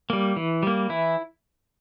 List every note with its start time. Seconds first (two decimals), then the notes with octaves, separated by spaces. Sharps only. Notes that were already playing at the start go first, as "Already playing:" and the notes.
0.10 G3 A#3
0.36 E3
0.63 G3 A#3
0.89 E3 E4